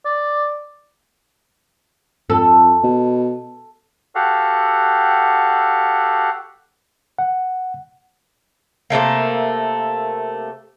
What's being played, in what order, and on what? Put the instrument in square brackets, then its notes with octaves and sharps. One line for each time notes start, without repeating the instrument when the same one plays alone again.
[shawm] D5
[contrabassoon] F2 [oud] A4
[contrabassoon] B2
[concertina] F#4 G4 A4 F5 F#5
[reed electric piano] F#5
[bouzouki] C3 F#3 A3 A#3